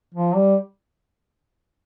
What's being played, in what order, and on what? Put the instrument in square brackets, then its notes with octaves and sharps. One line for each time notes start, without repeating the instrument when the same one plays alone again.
[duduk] F3
G3